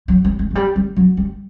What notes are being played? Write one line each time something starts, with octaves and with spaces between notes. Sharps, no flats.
F#3
G3
G#3
F#3
G3
G3
F#3
G3